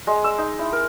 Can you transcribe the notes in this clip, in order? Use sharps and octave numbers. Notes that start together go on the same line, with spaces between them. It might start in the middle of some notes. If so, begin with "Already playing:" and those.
G#3
E6
D#4
E4
A#4